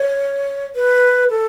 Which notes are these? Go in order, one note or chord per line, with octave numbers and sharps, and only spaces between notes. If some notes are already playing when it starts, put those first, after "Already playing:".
Already playing: C#5
B4
A4